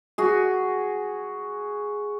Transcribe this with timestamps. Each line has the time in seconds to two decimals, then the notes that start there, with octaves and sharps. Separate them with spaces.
0.18 F#4 G#4